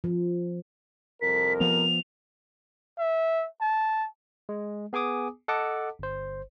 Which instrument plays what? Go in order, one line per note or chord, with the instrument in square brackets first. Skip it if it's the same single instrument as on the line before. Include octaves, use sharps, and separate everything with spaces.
[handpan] F3
[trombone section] C2 F2 A#4 [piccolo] B6
[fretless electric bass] F3 B3 [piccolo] F7
[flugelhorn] E5
A5
[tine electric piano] G#3
B3 G#4 G#5 D6 D#6
A4 D#5 F#5 A5 D6
G1 C5